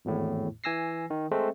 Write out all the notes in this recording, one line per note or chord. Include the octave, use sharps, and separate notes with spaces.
G#1 E2 A2
E3 G#5 E6 A#6 C7
D#3
G#3 A3 C4